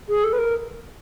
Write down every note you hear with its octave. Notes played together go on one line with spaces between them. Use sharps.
G#4
A4
B4
A#4